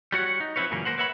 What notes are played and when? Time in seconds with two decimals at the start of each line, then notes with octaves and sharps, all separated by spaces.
0.12 G3 F#4 C#5 F#5
0.40 D#4
0.56 F3 C4 E4 F4 B4 C#5
0.71 F#2 A#2 C#3 E3 A#3 C#4
0.85 A#3 A#4 C5 F#5
0.98 B4 C#5 E5 F#5 B5